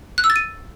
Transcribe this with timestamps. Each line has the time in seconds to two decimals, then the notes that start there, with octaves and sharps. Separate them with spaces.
0.18 F#6
0.24 E6
0.30 A6
0.36 D#7